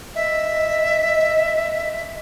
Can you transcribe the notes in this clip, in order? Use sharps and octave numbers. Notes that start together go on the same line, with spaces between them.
D#5 E5